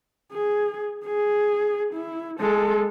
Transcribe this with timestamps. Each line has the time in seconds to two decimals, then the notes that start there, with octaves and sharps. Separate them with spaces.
0.33 G#4
1.05 G#4
1.94 E4
2.40 G#3 A4